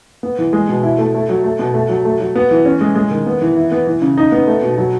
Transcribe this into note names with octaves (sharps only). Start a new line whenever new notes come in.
B3
E3
G#3
B2
E4
A3
A3
F#3
A3
B2
A3
F#3
A3
F#3
B3
E3
C#4
G#3
G#3
D#3
B3
E3
E4
B3
E3
C#3
D#4
B3
A3
B2
F#3